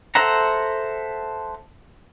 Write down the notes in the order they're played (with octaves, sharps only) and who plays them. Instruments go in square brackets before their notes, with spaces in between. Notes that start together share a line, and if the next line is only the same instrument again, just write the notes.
[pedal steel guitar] A4 C5 E5 F#5 A#5